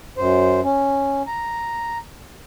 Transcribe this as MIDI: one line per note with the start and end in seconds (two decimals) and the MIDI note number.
0.17 0.61 42
0.17 0.61 72
0.64 1.22 61
1.27 1.98 82